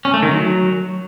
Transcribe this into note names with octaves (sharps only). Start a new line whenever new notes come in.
C#4
A3
D#3
F#3